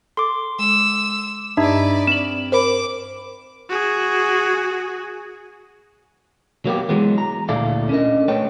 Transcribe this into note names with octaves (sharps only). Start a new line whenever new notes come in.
A4 C6 D6
G#3 E6
G2 D4 D#4 B4 D5 E5
C4 E7 F#7
A#4 C5 B5 D6
F#4 G#4
F#3 A#3 B3 G4
E3 F#3 G#3 B3
A#5
D2 A#2 E4 A4 D5 F5
C#4 D4 A#4 D#5
A3 A4 B4 C#5 G5